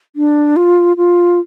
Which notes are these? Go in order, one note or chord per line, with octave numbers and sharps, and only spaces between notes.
D4
F4
F4